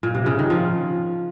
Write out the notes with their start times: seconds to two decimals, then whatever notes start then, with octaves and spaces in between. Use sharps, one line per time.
0.03 A#2
0.15 C3
0.26 C#3
0.39 D#3
0.50 F3